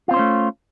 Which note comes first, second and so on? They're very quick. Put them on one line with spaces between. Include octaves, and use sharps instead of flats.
F4 C4 C5 C#4 A3